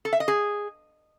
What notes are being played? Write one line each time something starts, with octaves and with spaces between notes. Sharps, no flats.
A4
E5
D#5
G#4